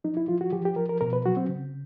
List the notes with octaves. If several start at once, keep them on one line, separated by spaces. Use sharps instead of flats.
F3 D#4
E4
F3 F4
F#4
F3 G4
G4
F3 A#4
A#4
B2 A#4
B4
F#3 F#4
C4
C#3